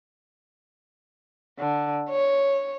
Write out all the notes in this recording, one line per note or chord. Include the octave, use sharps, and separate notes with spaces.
D3
C#5